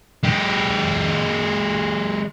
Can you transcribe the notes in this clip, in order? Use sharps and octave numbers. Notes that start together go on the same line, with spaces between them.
G#3 G4